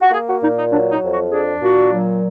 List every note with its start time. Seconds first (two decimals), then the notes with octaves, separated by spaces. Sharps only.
0.02 F#4
0.11 A#3 G#4
0.27 F#4
0.41 A#2 D#4
0.57 D#4
0.71 F#3 D4
0.92 D#4
1.02 F2
1.12 F#4
1.32 D4 G#4
1.61 A#2 F#4
1.93 F#3